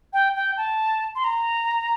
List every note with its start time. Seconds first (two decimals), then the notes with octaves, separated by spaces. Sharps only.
0.13 G5
0.36 G5
0.57 A5
1.16 C6
1.24 A#5